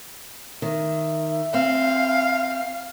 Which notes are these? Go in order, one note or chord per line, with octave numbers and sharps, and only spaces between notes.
D#3 E5
C4 F5